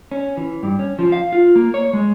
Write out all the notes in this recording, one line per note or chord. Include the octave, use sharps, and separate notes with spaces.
C#4
E3
G2
C#4
F3
F5
F4
A#3
C#5
G#3